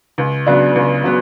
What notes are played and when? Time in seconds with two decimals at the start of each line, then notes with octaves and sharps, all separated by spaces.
0.18 C#2
0.46 C#3 F#3 B3 D4
0.75 C#2
1.04 C#3 F#3 B3